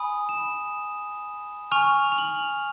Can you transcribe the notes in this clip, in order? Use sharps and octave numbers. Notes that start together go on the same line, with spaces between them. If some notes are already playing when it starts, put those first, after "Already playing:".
Already playing: G#5 B5 D#6
E7
G#5 C#6 F6 F7
F7
F#7